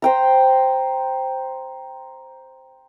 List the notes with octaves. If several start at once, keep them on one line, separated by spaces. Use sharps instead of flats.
C5 G5 A#5